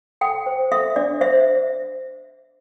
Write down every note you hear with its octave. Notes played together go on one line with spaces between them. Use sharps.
A4 G5
C5
A4 E5
D4 D5
C5 E5